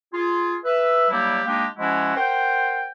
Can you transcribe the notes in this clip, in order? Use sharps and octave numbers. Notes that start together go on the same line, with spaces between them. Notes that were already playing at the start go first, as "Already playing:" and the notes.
F4 G#4
B4 E5
F#3 G3 A#3 D4 E4 G4
G#3 A#3 D4 D#4 G4
F3 G#3 C#4 E4 F#4
A#4 C5 F#5 G5